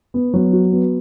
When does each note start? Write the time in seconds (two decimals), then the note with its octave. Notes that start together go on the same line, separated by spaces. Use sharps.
0.14 B3
0.34 F#3
0.53 F#4
0.72 B3